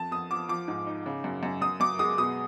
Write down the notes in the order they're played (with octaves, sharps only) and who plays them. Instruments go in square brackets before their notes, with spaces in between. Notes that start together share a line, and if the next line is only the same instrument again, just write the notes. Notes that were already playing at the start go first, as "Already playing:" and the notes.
Already playing: [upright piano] F2 A5
F2 D#6
F3 D6
F3 D6
G#2
D#4
C#3
F#2
F#2
F#2 D#6
F#2 D6
G#3 D#6
B2 D#6